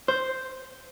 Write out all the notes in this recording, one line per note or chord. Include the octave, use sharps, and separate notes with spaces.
C5